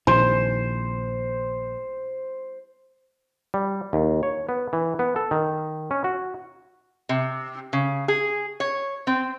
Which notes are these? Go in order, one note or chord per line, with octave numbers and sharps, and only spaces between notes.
A#1 D#3 C5
G3
D#2
C#5
B3
E3
B3
A4
D#3
C#4
F#4
C3
C#3
G#4
C#5
C4